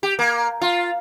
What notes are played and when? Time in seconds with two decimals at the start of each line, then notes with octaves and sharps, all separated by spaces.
0.03 G4
0.19 A#3
0.61 F4